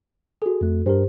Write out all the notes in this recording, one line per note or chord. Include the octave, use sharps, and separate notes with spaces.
F#4 G#4 A4
F2 A3
G2 G4 A#4 C5